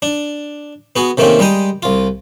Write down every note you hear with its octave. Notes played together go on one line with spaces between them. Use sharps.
D4
B3 F#4 G#4
C3 D#3 A3 A#3 C4 C#4
G3 G#3 G5 A#5 D#6
C2 F4